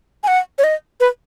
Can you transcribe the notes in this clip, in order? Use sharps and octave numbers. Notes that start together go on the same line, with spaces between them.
G#5
F#5
C#5
D#5
B4